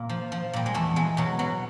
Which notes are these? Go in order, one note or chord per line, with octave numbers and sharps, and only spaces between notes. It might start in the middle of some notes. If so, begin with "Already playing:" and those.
Already playing: A#2 A#3
F3
F3
A#2 G3
G#3
E2 A3
E2 G#3
B2 F#3
B2 F#3